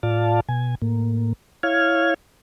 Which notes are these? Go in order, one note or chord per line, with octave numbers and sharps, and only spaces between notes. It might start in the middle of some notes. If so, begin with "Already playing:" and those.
A2 F4 D5 F5 A5
B2 G#5
A2 A#3
E4 C#5 F5 F6 G#6